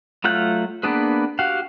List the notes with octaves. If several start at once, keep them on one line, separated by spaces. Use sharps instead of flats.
F#3 A3 F4 F#5 G6
A#3 B3 D4 G#4 B4
F#4 G4 F5 F#5